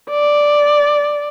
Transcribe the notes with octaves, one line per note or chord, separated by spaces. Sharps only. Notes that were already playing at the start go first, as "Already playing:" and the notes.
D5